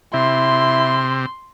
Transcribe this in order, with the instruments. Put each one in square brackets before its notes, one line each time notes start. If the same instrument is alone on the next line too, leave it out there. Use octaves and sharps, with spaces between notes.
[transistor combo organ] C3 [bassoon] E4 [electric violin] C6